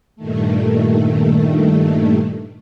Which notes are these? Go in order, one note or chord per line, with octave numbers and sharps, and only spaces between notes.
G2 A#2 D#3 A3